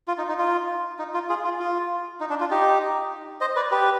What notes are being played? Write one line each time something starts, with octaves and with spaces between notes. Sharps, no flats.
F4
D#4
D#4
F4
D#4
F4
F4 G#4
F4
F4
D#4
D4
F4
D#4 G4
C5 D#5
B4 D5
G4 B4